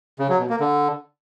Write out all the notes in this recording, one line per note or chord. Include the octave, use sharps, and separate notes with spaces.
C#3
F#3
B2
A#3
D3